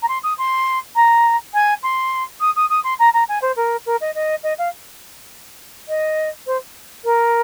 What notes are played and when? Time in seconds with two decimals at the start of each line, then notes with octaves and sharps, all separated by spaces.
0.02 A#5
0.08 C6
0.23 D#6
0.38 C6
0.95 A#5
1.54 G#5
1.83 C6
2.40 D#6
2.56 D#6
2.70 D#6
2.84 C6
2.99 A#5
3.13 A#5
3.28 G#5
3.42 C5
3.56 A#4
3.86 A#4
4.01 D#5
4.15 D#5
4.43 D#5
4.58 F5
5.88 D#5
6.46 C5
7.04 A#4